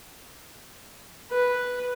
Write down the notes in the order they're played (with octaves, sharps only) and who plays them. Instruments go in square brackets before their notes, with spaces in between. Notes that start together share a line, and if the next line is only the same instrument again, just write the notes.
[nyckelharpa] B4